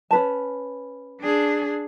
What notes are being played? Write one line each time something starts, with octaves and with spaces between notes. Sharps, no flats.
C#4 B4 A5
D4 G#4